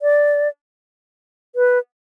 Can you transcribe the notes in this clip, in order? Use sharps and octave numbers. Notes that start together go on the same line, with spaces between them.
D5
B4